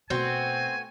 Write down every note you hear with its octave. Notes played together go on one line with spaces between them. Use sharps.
B2 A3 B3 C4 F#4 G#5